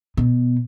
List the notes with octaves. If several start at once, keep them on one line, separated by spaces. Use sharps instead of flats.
B2